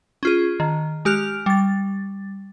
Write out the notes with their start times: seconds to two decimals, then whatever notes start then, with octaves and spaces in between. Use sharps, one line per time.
0.23 C#4 F4 G#4
0.60 D#3
1.05 G#3 G4 F6 F#6 F7
1.46 G3 A6